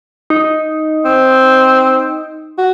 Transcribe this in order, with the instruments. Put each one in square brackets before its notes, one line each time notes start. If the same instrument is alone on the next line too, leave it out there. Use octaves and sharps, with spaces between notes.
[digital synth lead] D#4
[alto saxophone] C4
F#4